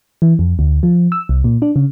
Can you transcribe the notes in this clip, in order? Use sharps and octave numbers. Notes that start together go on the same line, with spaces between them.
E3
F2
D2
F3
E6
C2
A#2
D4
C#3